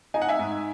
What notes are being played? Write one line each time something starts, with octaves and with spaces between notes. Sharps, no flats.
D#4 G#5
F#5
E5 G#5
G#2